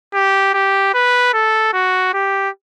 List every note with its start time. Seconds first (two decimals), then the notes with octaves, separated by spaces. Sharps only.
0.14 G4
0.54 G4
0.94 B4
1.33 A4
1.74 F#4
2.14 G4